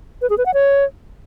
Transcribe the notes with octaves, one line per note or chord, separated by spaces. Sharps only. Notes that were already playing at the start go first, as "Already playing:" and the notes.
B4
G#4
B4
F#5
C#5